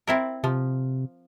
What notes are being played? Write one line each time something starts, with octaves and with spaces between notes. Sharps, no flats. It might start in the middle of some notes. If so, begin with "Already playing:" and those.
C4 E4 A#4
C3 F3